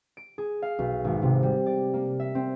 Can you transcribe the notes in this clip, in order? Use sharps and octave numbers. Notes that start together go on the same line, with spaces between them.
D7
G#4
F5
B1
G#1
C3
G3
D5
A#3
E5
C4